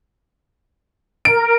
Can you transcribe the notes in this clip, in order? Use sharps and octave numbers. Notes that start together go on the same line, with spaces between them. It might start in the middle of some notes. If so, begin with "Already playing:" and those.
A#4 D7